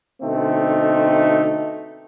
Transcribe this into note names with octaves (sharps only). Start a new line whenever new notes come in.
B2 D3 A3 C4 D#4